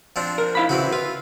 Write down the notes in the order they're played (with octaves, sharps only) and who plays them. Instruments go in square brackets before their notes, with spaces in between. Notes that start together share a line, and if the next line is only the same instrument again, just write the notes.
[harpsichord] F3 C4 D4
[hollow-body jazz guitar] A#4
E4 F5 B5
[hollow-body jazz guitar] C#3 [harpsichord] E3 C4 F#4
[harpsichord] F4 [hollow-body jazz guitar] B4